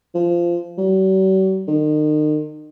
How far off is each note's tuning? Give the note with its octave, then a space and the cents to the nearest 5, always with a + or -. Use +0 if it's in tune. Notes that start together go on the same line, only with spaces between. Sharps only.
F3 -15
F#3 +45
D#3 -40